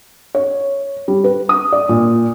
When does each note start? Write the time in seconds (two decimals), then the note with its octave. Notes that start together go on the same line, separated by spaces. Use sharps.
0.35 C#5
1.08 G3
1.24 B4
1.49 D#6
1.72 D5
1.89 A#2